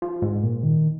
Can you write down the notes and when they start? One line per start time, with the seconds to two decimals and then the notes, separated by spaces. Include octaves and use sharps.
0.02 F3
0.22 G#2
0.43 A#2
0.63 D#3